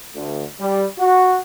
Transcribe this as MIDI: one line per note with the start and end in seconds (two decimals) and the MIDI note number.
0.15 0.44 38
0.60 0.85 55
0.98 1.38 66